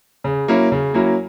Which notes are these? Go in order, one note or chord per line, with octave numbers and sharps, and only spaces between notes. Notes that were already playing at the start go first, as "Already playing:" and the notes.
C#3
F#3 A#3 C#4 E4
C#3
F#3 A#3 C#4 E4